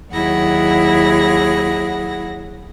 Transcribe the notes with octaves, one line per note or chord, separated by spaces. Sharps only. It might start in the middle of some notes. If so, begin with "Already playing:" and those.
D#2 F#3 E4 G#4 F#5 A#6